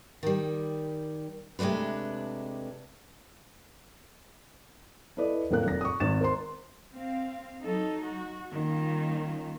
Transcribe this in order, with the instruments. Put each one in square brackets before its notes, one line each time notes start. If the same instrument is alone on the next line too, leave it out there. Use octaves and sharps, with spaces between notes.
[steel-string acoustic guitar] D#3 G3
C3 G#3 A3 D4 B4
[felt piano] E4 A4 B4 D5 D#5
F1 A2 A#3 A#4 F#6
F1 A#6
C#6 D#6
G#1 A6 E7
A#4 C5 A#5 C6
[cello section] C4 F5
F#3 D#4 A4
F#4
D#3 G3 A#3 C#4 F4